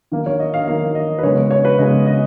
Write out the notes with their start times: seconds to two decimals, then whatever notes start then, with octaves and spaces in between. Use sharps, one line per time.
0.12 D#3 A#3
0.26 C#5
0.40 D#5
0.54 F5
0.68 D#3 A#3 F5
0.95 D#5
1.19 B4
1.23 C#3 G#3 B3 C#5
1.37 B4
1.51 C#5
1.65 B4
1.79 C#3 G#3 B3 D#5
2.06 D#5